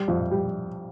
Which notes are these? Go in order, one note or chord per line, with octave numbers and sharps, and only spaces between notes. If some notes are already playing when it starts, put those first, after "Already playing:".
Already playing: G3
F2
G3